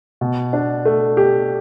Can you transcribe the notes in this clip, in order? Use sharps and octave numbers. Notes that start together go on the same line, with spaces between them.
B2
D4
A3
G4